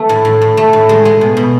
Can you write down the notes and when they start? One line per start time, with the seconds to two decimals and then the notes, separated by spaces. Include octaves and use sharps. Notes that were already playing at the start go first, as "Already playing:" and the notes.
Already playing: E3 A3
0.09 A2
0.25 A2
0.42 A2
0.57 A3
0.73 A2
0.89 G#3
1.05 G#3
1.21 B2
1.37 B2